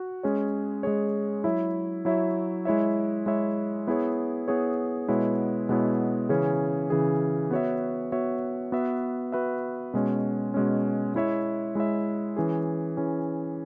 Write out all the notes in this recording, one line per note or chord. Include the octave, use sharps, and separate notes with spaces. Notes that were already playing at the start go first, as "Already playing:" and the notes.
Already playing: F#4
G#3 C#4 G#4 C#5
G#3 C#4 G#4 C#5
F#3 E4 C#5 E5
F#3 E4 C#5 E5
G#3 E4 C#5 E5
G#3 E4 C#5 E5
B3 E4 G#4 C#5
B3 E4 G#4 C#5
B2 G#3 B3 E4 C#5
B2 G#3 B3 E4 C#5
C#3 E3 C#4 G#4
C#3 E3 C#4 G#4
B3 F#4 C#5 E5
B3 F#4 C#5 E5
B3 F#4 B4 E5
B3 F#4 B4 E5
B2 G#3 C#4
B2 G#3 C#4
G#3 E4 C#5 E5
G#3 E4 C#5 E5
E3 C#4 G#4
E3 C#4 G#4